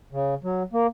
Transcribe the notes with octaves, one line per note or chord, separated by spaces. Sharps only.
C#3
F#3
A#3